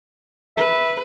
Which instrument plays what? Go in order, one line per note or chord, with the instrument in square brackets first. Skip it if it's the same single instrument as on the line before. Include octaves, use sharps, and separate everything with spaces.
[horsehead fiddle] B4 [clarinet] E5